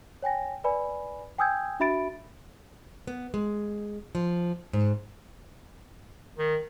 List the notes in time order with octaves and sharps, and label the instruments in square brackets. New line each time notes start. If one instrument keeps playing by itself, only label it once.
[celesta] C#5 G5 G#5 A#6
B4 D5 G#5 B5
G5 G#5 D#6 E6 G6 G#6
D4 F#4 E5 B5 A6 D7
[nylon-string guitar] B3
G#3
F3
G#2
[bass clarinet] D#3